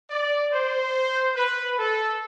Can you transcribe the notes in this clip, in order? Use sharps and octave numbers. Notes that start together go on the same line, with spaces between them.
D5
C5
B4
A4